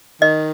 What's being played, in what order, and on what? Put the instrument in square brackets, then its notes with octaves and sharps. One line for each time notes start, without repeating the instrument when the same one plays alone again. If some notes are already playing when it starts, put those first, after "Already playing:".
[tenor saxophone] D#3 [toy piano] D#5